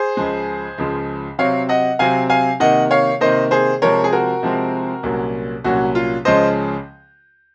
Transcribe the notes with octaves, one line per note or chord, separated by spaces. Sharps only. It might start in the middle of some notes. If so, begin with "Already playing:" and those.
Already playing: G#4 C5
C#2 C#3 F3 G#3
C#2 C#3 F3 G#3
C3 F#3 C4 C#5 F5
D#5 F#5
C3 F#3 C4 F5 G#5
F5 G#5
C3 D#3 A#3 D#5 F#5
C#5 F5
C3 D#3 A#3 C5 D#5
G#4 C5
C3 F3 G#3 C4 A#4 C#5
G#4
F#4 A#4
C3 F3 G#3 C4
C2 A#2 F#3 A#3 C#4
C2 A#2 F#3 A#3 C#4 F#4
F4
C#2 C#3 F3 G#3 C#4 C5 D#5